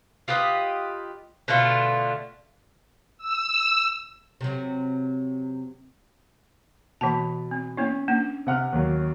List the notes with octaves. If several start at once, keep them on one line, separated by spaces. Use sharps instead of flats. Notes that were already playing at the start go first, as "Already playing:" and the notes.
F4 G4 B4 D#5
B2 D3 A3 F4
E6
C3 F#3
B2 E3 A#3 A5 B5
C4
A#3 B3 C#4 E4
A#3 D4
C3 F#5 F6
D#2 F#3